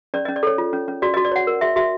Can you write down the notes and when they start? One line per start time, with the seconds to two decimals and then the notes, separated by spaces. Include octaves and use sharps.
0.14 C#4 D5
0.25 C#4 D#5
0.36 D5
0.43 A4 C#5
0.58 F4
0.73 C#4
0.88 C#4
1.02 F#4 D5
1.14 F#4 D#5
1.25 D5
1.32 C#5 F#5
1.47 A#4
1.61 F#4 E5
1.76 F#4 E5